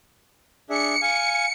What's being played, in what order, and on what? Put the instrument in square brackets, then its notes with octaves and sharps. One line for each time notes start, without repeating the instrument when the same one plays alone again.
[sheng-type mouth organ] D4 G#4 E5 [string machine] C#7
[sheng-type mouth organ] F5 G#5